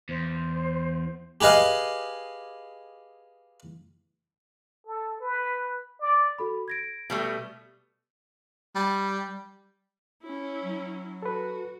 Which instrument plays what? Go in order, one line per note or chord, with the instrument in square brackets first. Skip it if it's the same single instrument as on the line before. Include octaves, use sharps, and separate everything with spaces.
[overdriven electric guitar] E2 [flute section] C5
[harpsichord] G4 G#4 B4 D#5 F5
[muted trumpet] A4
B4
D5
[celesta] F#4 A4 B5
G#6 A#6 D7
[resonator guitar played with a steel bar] B2 G3 A3
[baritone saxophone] G3
[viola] C#4 E4
[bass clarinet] F#3
[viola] F#4 [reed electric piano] A4 B4